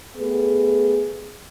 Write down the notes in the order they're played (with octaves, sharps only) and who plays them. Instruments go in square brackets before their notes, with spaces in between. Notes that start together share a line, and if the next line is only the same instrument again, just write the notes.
[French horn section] A3 B3 G4 G#4